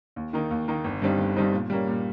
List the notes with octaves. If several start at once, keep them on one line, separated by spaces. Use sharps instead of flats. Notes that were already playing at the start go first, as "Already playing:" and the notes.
D#2
D#3 A#3 D#4
D#2
D#3 A#3 D#4
G1
G2 G3 C4 D#4
G1
G2 G3 C4 D#4
A#2
G3 A#3 C#4
A#2